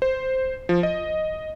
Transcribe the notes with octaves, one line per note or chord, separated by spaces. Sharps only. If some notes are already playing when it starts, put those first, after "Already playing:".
C5
F3
D#5